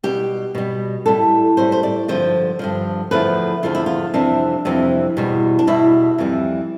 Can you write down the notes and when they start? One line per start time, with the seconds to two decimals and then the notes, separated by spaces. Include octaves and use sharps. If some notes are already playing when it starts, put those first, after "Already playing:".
0.04 B2 G3 G4
0.55 B2 G3
1.06 A2 G3 A4
1.57 A2 G3 C5
1.72 C5
1.83 D5
2.08 G2 D3 F3 C5
2.59 G2 D3 F3
3.11 E2 D3 F3 A3 B4
3.63 E2 D3 F3 A3 F4
3.75 E4
3.86 F4
4.14 F2 C3 E3 G3 D4
4.65 F2 C3 E3 G3
5.17 E2 B2 G3
5.59 D4
5.67 E2 B2 G3 E4
6.18 F2 E3 G3